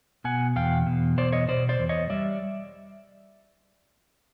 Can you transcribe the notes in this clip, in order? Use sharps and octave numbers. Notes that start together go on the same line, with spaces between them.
B2 F#5 G#5
E2 F5 G5
B2
E2 C5 D5
C#5 D#5
B2 C5 D5
C5 D5
E2
C#5 D#5
G3 D5 E5